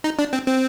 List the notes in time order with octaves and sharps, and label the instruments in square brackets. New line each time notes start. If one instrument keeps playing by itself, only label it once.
[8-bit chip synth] D#4
D4
C4
C4